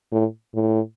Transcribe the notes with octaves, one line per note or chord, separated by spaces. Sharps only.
A2
A2